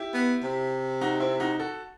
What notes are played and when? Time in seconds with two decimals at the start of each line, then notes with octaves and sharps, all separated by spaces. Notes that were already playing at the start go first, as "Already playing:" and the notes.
Already playing: E4 G4
0.14 B3
0.43 C3
1.01 D#4 F#4
1.20 C4 E4
1.40 D#4 F#4
1.59 F#4 A4